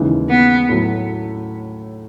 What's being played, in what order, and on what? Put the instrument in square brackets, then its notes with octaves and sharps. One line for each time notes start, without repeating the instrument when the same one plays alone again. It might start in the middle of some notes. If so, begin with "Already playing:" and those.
Already playing: [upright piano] D#2 C#3 E3 G#3
[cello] B3
[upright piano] A2 F#3 A3